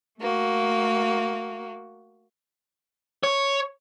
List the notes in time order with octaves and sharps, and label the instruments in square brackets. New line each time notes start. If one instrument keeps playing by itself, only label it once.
[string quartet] A3 A#3 F#4
[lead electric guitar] C#5